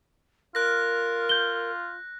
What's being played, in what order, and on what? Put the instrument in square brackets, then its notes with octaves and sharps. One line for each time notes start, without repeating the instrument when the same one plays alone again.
[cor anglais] F4 [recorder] A#4 [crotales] F#6 A#6
[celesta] G6 G7